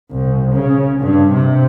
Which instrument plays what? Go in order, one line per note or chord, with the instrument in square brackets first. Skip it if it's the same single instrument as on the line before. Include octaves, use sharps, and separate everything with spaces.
[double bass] C2
C#3
G2
C3